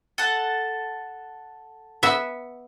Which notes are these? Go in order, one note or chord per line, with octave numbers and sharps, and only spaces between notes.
A4 F#5 A5
B3 E5